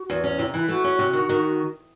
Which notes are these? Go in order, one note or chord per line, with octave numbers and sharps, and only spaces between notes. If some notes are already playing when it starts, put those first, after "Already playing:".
Already playing: F#4
E2
C#4
C3 E4
D#4
E3 E4
A3 F#4
C#4
C3
D#3
D#3